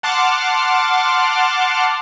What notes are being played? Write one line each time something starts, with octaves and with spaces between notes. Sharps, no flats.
F#5 A5 C6 D6 F6